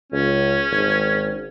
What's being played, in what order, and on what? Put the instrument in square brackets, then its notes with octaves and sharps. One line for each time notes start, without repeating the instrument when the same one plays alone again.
[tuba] C#2 [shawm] C#4
[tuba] G#1